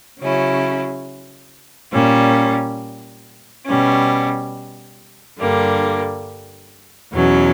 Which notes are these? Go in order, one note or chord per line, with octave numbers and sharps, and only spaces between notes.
C#3 F#3 C#4 E4
A#2 G3 C#4
B2 G3 C#4
G2 D3 G3 A#3
E2 B2 F#3 C#4